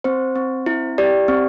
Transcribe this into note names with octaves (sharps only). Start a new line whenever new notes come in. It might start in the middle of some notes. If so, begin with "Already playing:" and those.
C4 C5
C4
E4
G4 D5
C4